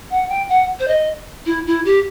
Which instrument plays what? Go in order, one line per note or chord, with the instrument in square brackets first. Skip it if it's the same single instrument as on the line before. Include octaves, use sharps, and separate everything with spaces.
[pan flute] F#5
G5
F#5
C5
D#5
E4
E4
G4